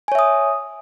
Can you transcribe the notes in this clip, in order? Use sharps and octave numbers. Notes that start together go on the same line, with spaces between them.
C#5 E5 G#5 D#6